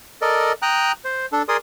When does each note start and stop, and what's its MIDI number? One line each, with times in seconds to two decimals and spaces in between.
0.22 0.52 69
0.22 0.52 70
0.22 0.52 74
0.22 0.52 75
0.62 0.92 79
0.62 0.92 82
0.62 0.92 87
0.62 0.92 90
1.05 1.26 72
1.32 1.42 62
1.32 1.42 69
1.48 1.57 68
1.48 1.57 70
1.48 1.57 74
1.48 1.57 84
1.48 1.57 87